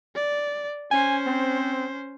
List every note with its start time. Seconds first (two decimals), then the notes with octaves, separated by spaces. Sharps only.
0.16 D5
0.91 C#4 C5 G#5
1.26 C4